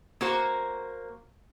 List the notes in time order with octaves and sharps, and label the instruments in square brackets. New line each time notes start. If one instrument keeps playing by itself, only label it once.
[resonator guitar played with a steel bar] A#3 F#4 C5